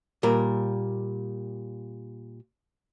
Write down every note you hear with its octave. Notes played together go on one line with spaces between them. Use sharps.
A#2 G3 A#4